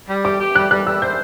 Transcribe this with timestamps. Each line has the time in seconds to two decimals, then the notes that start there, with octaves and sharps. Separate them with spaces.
0.09 G3
0.24 G4 D6
0.40 G4
0.55 G3 F#6
0.71 G3 F#6
0.87 G3 E6
1.02 C5 G6